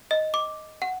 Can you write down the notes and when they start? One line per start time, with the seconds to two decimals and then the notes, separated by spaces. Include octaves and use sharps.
0.11 D#5
0.34 D6
0.82 F#5